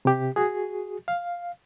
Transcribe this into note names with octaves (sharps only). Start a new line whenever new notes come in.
C3 G4
F#4 G#4
F5